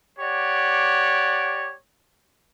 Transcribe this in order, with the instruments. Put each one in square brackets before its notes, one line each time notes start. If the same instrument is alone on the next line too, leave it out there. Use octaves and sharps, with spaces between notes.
[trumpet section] G4 C#5 D5 F#5